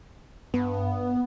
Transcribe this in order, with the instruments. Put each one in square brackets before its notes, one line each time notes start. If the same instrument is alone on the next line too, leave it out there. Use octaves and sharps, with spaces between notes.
[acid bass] G2 [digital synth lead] B3